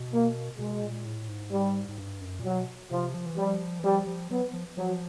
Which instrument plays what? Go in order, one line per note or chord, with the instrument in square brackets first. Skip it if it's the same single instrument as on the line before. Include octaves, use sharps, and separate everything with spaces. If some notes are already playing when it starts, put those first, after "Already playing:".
Already playing: [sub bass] B2
[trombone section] A#3
[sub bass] B2 [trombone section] G#3
[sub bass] A#2
A2
G#2
[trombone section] G3
[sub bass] G#2
G2
F#2
A#2
[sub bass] B2 [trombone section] F#3
[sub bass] C3 [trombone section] F3
[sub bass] F3
E3
[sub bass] F3 [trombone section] G3
[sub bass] E3
[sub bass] F3 [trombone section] G3
[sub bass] F3
[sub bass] F#3 [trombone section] B3
[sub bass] F3
[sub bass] F3 [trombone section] F#3